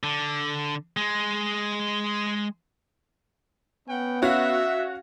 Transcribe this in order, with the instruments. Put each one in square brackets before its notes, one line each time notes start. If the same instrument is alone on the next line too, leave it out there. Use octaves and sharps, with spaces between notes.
[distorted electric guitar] D3
G#3
[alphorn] B3 [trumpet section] C#4 F#5 G5
[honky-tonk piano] C#4 F#4 F5 [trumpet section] E5